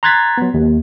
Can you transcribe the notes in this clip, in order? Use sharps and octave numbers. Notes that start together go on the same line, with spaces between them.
A#5 C6 F#6 G#6 A6 B6
F#3 B3
D#2